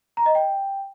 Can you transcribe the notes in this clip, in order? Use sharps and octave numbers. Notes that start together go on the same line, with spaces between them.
A#5
D#5
G5